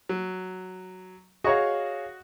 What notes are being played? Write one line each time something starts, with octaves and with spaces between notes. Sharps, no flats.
F#3
F#4 G#4 C#5 D#5 F5 C#6